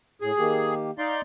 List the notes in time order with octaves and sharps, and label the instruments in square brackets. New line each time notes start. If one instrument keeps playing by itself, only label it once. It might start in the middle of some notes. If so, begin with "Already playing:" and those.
[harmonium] A2 [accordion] G#4
[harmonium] D#3 A#3 G4
[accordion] D#4 D5 C6 [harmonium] F5